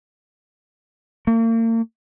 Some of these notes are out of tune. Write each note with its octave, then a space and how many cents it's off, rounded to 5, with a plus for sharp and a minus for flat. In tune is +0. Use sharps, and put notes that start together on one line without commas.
A#3 -40